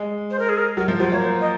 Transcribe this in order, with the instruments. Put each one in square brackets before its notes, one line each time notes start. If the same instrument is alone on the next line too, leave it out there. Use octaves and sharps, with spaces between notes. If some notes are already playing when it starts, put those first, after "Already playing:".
Already playing: [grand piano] G#3
[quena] C5
A#4
G#4
A#4
[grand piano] F#3 [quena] A#4
[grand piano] F3
[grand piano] F#3 [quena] C5
[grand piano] A#3 [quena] C#5
[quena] C5
D#5